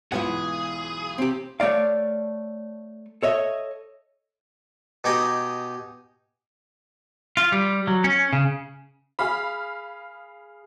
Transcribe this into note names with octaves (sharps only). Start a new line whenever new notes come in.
B1 G#2 E3 F4 G#4 B4 F#5
C4 G4
A3 C#5 D5 F5
A4 C#5 D#5 E5
B2 D#4 G4 D#5 G#5 D#6
F4
G3
F#3
C#4
C#3
G#4 F5 B5 D#6